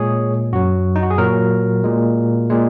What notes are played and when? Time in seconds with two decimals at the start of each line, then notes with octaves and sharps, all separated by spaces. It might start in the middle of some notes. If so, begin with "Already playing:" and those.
Already playing: A#2 G#3 G#4 C#5
0.53 F#2 F#3 F#4
0.96 D#4
1.03 F#4
1.10 G#4
1.18 A#2 F#3 F#4 A#4
1.84 A#2 G#3
2.50 A#2 G#3